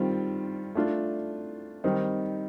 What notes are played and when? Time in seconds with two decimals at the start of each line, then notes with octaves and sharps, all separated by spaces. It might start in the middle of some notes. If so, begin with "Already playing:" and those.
Already playing: D#3 G3 C4 F4
0.75 A3 D4 F4
1.84 D#3 G3 C4 D#4